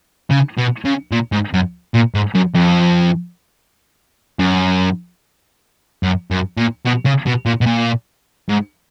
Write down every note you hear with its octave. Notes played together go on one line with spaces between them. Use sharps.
C#3
B2
C#3
A#2
G#2
F#2
A#2
G#2
F#2
F2
F#2
F#2
F#2
A#2
B2
C#3
B2
A#2
B2
A#2
G#2